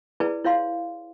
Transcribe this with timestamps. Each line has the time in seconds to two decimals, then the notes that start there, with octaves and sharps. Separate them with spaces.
0.20 E4 G#4 B4 D5 A5
0.44 E4 C#5 F5 C6